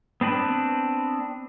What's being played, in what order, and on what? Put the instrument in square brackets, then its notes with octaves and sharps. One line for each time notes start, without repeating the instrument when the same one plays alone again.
[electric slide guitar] B3 C4 D4 B4